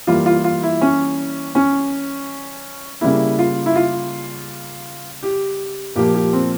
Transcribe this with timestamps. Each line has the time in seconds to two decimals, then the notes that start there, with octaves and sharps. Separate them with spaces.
0.07 E3 G3 A#3 F4
0.26 F4
0.44 F4
0.63 E4
0.81 C#4
1.55 C#4
3.01 C#3 G3 A#3 E4
3.39 F4
3.66 E4
3.76 F4
5.23 G4
5.95 A#2 F3 A#3 G4
6.14 G4
6.33 C4